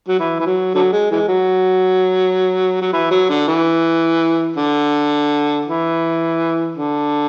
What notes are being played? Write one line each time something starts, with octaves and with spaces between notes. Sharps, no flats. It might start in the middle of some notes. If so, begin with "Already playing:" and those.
F#3
E3
E3
F#3
D3 F#3
G#3
E3 G#3
F#3
F#3
E3
F#3
D3
E3
D3
E3
D3